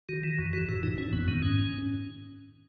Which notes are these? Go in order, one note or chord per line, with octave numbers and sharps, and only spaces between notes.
D#3 F#4
E3
F#2
E3 F#4
A2 F#4
E3 D#4
A2 C#4
F#2 B3
D#3 B3
G#2 C#4